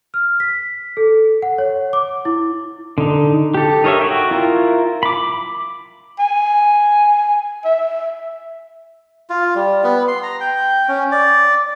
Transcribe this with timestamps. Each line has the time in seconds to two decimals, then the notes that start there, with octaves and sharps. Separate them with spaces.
0.14 F6
0.40 B6
0.97 A4
1.42 F#5
1.58 C#5
1.93 D6
2.25 E4
2.98 D3 D#4
3.54 G4 A4
3.84 D#4 A#4 C#5 D#5 E5
4.01 F#4 G5
4.31 E4 F4 A#4
5.03 B5 D6
6.19 G#5
7.65 E5
9.30 F4
9.55 G3
9.84 B3
10.08 C6
10.23 A#5
10.40 G5
10.88 C#4
11.12 D5